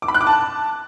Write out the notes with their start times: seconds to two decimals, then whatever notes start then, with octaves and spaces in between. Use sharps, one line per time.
0.02 D6
0.08 B5
0.14 F#6
0.21 D6
0.27 A5